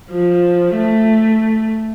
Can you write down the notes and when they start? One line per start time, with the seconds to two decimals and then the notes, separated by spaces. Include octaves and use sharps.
0.12 F3
0.76 A3